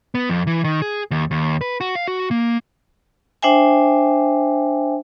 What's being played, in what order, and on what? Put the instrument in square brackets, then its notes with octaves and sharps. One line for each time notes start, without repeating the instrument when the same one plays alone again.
[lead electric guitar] B3
F2
E3
D#3
G#4
D#2
D#2
B4
F#4
F5
F#4
A#3
[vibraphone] D4 C5 E5 G5 G#5